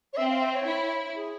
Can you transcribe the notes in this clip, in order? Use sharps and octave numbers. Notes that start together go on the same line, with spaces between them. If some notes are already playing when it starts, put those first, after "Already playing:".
C#5
C4 E5
F5
E5
C#5
E4
G#4